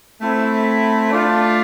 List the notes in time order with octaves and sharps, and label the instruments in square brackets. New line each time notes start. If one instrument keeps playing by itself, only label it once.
[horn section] A3 C4 E4
A3 D4 F4